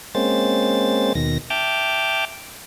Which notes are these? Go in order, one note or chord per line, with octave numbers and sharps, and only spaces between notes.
G#3 A#3 C4 C#4 C5 A6
D#2 B2 D#3 A#6
E5 G5 A5 D6 F6 G6